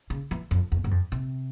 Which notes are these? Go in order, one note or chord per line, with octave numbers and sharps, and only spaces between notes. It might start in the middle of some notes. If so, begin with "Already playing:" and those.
C#3
E3
F2
E2
G2
F2
C3